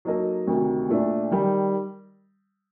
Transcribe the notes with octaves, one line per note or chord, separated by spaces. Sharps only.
F#3 A#3 D#4 A4 D#5
D2 C3 D#3
A#2 A3 D4
D#3 G3